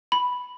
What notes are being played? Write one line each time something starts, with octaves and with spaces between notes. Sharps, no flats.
B5